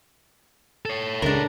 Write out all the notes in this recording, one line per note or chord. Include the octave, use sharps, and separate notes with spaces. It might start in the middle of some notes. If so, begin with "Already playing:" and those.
A4 C#5
C#2 C#3 G#3 D4 A#4